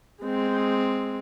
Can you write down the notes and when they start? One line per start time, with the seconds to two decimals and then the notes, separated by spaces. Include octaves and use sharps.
0.23 G#3 C4